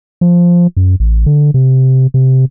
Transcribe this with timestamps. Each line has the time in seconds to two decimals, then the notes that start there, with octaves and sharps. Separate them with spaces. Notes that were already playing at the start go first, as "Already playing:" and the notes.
0.21 F3
0.77 F#2
1.00 A1
1.26 D3
1.54 C3
2.14 C3